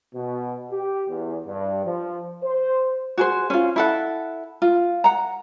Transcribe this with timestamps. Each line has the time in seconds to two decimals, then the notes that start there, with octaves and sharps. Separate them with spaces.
0.15 B2
0.71 G4
1.08 E2
1.47 G2
1.84 F3
2.43 C5
3.18 F#4 G#4 C5
3.50 C#4 F4
3.76 E4 A4 F#5
4.62 F4
5.04 F#5 A#5